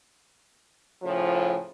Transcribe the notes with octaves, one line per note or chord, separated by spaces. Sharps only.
A2 C#3 F3